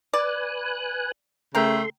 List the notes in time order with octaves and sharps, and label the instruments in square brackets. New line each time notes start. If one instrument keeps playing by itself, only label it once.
[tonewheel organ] B4 G#5 F#6 [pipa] D5
[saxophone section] C#3 A3 [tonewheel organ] A4 C6 [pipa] A#4 G5